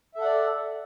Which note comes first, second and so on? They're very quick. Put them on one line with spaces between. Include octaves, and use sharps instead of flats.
E5 A4 F#5 D5